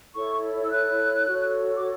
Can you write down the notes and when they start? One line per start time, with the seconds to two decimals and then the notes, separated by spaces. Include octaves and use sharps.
0.15 E4 A4 C#5 C#6
0.64 E6
0.71 F#6
1.28 F#4 A4 C#5
1.76 D6